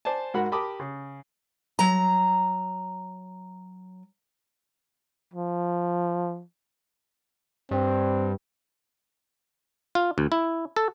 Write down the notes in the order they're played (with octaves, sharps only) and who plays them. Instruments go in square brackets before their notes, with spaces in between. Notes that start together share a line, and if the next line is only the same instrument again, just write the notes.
[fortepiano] C5 D5 G#5 A5
G#2 F#4 A#4 F#5 B5
G4 A#4 A5 B5 D6 D#6
C#3
[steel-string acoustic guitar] F#3 A#5
[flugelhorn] F3
[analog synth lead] G2 [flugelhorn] C4
[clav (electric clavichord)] F4
D2
E4
A4